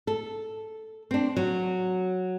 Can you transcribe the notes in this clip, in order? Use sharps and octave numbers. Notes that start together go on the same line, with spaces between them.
A4
C4 D4
F#3